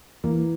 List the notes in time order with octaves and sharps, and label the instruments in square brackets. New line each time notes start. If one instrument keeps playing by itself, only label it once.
[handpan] E3 [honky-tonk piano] A#3